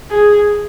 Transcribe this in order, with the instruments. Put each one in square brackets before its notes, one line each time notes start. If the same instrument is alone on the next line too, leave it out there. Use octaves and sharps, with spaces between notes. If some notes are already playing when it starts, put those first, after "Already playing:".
[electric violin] G#4